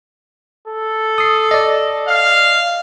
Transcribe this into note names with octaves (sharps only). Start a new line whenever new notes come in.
A4
D#6 C7
D5 D#5
F5